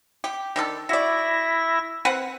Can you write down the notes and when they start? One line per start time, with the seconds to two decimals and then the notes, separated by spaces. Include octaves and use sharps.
0.24 G4
0.56 D#3 D4 A4
0.89 E4 F#4 D5 E5 A#6
2.05 C4 B4 F#5